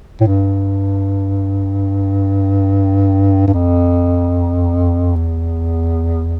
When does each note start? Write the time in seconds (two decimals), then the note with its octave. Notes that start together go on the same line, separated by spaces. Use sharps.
0.21 A2
0.27 G2
3.48 G2
3.54 F2
5.16 E2